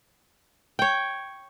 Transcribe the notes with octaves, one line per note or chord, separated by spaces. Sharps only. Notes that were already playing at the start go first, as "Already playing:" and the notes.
C#5 G5